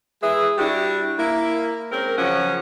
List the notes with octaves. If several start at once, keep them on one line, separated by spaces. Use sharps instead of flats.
G#3 E4 G#4 B4 E5
G3 D4 E4 F#4 G4
A#3 E4
G#3 C4 C#4 A#4
C#3 F3 F#3 C#4 F#5